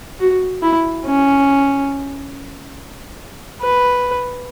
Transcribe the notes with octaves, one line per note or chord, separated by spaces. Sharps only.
F#4
E4
C#4
B4